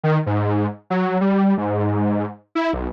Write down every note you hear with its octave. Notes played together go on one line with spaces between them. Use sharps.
D#3
G#2
F#3
G3
G#2
E4
B1